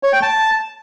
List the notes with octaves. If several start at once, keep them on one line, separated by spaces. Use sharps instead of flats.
C#5
G5
A5